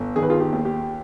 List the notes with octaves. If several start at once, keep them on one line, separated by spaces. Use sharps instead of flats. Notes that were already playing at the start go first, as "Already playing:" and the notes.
Already playing: G1
D#3 G#4
B4
F4 G#4
G4
D#2
G4